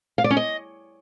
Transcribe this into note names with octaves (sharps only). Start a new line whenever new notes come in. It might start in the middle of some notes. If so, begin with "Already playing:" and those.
F5
D5
C#4
D#5